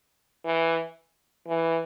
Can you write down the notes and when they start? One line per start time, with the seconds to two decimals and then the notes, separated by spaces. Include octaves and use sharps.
0.45 E3
1.48 E3